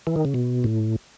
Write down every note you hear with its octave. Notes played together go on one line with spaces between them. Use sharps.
E3
D#3
C#3
B2
A2